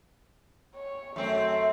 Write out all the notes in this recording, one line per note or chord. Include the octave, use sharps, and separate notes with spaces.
C#5
F#2 A3 C4